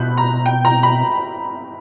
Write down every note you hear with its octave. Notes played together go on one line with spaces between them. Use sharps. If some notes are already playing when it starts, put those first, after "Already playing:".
Already playing: B2 B5 F#6 G6
A#5
G5
A#5
B5